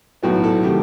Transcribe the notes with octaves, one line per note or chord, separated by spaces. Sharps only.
B1 A2 F#3 B3 F#4
A4
C3 D#3 A3 G4